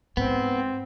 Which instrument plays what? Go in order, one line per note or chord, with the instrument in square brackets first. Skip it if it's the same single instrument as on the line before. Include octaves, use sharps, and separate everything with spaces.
[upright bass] G#2 [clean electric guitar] B3 [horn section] C4